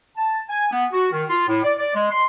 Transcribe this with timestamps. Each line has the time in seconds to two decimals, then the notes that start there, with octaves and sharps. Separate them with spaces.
0.17 A5
0.49 G#5
0.72 B3
0.93 F#4
1.12 D#3
1.29 F4
1.48 A2
1.64 D5
1.78 D5
1.94 G#3
2.11 C6